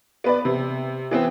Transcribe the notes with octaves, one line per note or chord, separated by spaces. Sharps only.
B3 B4 D5
C3
E3 B3 C4